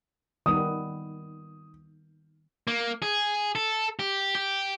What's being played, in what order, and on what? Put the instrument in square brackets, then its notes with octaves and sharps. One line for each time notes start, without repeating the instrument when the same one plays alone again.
[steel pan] D#3 G3 B3 [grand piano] D#6
[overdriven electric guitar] A#3
G#4
A4
G4
G4